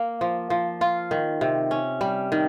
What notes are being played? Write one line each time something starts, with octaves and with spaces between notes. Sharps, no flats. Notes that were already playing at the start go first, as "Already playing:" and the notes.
Already playing: A#3
F3
F3
F4
D#3
C3
C#4
G3
D#3